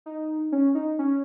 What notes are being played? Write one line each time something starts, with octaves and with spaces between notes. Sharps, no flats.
D#4
C#4
D#4
C#4